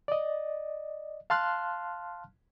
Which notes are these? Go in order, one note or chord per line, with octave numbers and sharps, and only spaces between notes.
D5 D#5
F5 A5 C6 F6 F#6